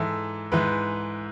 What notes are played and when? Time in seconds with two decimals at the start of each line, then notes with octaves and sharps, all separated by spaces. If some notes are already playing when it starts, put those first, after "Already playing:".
Already playing: G#2 E3 A4
0.52 G#2 E3 B4